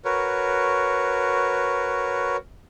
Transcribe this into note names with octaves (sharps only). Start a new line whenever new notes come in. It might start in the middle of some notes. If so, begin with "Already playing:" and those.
F#4 A#4 B4 C#5